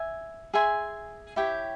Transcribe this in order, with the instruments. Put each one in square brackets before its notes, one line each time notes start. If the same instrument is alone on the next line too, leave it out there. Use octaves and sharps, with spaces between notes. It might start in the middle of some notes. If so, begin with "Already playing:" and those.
Already playing: [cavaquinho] E5 G#5
G#4 E5 G#5 C6
E4 G4 C#5 G5